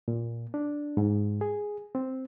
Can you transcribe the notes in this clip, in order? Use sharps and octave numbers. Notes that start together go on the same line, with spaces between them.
A#2
D4
G#2
G#4
C4